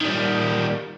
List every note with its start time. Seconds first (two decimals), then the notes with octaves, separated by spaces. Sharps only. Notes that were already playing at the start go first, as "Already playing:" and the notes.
0.01 D#3 G3